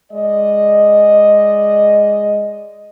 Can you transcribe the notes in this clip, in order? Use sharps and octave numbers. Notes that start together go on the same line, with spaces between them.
G#3 D5 D#5